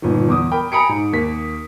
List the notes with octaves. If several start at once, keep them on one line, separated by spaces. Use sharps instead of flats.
G1 A#2 D#3
E2 D6 D#6
A#4 G5 B5
G#5 A#5 B5 D#6 C#7 D7
G#2
D#2 A#3 B6